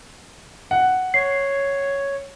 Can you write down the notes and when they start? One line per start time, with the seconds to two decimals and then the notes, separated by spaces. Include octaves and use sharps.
0.71 F#5
1.14 C#5 C7